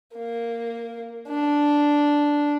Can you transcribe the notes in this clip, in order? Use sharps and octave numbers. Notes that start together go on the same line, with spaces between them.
A#3
D4